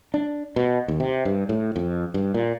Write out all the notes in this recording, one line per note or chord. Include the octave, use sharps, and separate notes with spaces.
D4
B2
D#2
C3
G2
A2
F2
G2
A#2